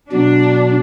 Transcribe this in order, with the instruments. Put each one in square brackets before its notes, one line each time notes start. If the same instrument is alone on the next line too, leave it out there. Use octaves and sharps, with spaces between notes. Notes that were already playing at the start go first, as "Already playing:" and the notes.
[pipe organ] B2 F#3 [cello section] D4